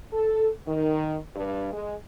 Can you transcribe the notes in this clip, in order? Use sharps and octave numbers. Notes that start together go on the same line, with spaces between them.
A4
D#3
G2
G#3